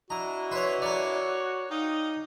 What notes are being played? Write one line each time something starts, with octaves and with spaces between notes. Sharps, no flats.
D4 E4 F#4 D#5 A#5
B4 C#5 C6
A#4 C#5 D5
D#4 F5 G5 A#5 D#6